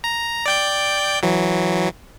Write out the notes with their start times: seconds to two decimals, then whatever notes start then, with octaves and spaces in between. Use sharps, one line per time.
0.04 A#5
0.46 D5 G5 G6
1.23 E3 F#3